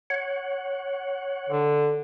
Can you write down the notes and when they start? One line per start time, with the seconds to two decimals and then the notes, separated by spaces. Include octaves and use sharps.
0.10 C#5 F#5
1.49 D3